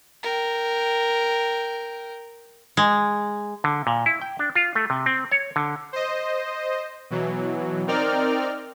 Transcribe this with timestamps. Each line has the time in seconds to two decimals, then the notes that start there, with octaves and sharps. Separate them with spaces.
0.23 A#4 G5
2.77 G#3
3.64 D3
3.87 A#2
4.06 E4
4.21 G5
4.39 D4
4.55 F4
4.75 A3
4.90 C3
5.06 C4
5.31 C#5
5.56 D3
5.93 C5 D#5
7.10 B2 E3 F#3
7.87 C4 D#4 A#4 D5 G5 F6